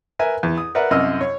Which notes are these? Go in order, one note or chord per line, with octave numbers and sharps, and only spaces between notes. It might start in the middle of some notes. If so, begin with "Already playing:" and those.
A#4 B4 E5 G#5
E2
D#6
A#4 B4 D5 E5 F#5
C2 F#2 C3 D#5 E6 F6
C#5